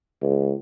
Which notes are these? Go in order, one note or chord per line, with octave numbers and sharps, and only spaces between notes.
C#2